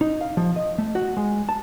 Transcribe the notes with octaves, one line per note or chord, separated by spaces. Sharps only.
D#4
F5
F3
D#5
A3
F#4
G#3
A5